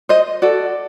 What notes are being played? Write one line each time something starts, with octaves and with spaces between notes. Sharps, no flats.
C5 D#5
F#4 A4 D5